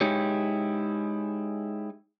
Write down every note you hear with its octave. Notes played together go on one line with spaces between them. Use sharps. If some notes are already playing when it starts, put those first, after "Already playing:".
G#3 D#4 E4 G4 C#5